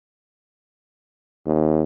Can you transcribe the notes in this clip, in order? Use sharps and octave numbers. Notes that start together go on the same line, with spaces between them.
D#2